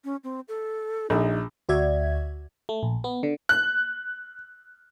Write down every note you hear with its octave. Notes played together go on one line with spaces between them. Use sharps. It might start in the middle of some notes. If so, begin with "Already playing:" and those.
C#4
C4
A4
A#1 D#4
D2 F#4 D5 E5 G#6
A3
A#1
B3
D3
F#6